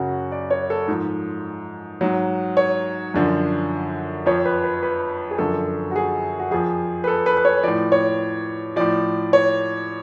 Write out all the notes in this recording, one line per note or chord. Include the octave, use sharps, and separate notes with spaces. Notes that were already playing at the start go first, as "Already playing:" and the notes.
Already playing: F#2 C#3 F#3 F#4
D5
C#5
A4
G#2 F3
G#2 F#3
C#5
F#2 D3 F3
F2 F3 C#5
B4
B4
B4
G#4
F#2 D3 F3 A4
F#4
G#4
F#4
F2 F3 G#4
B4
A4
B4
B4
C#5
A2 F3 D5
C#5
A2 F3 D5
C#5